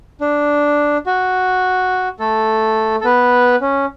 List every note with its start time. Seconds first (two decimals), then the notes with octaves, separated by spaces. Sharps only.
0.21 D4
1.07 F#4
2.19 A3 A4
3.01 A4
3.04 B3 B4
3.61 C#4